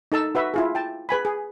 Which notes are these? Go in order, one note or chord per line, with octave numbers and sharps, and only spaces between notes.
D#4 A4 A5 E6
F#4 B4 E5
E4 F4 G#4
G5 A5
G#4 B4 G#5 B5
G#4